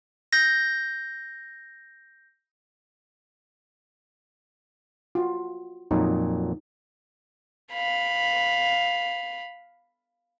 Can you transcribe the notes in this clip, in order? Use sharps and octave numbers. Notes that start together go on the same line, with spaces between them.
G6 A#6
F4 F#4
F2 A#2 F#3 D#4
F5 B5